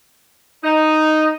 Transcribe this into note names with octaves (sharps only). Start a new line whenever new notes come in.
D#4